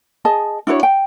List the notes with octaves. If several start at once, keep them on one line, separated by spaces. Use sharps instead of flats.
G#4 D#5 A5
D4 E4 F#4 C#5
G5